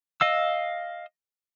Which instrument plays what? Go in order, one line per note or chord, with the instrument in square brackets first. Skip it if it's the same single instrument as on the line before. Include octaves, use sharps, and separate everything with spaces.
[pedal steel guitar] D#5 F5 E6